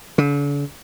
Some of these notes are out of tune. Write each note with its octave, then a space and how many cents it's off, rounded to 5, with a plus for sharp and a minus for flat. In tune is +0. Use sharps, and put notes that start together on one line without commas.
D3 -45